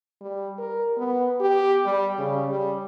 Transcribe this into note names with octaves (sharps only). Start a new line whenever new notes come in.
G3
A#4
B3
G4
G3
C#3
G3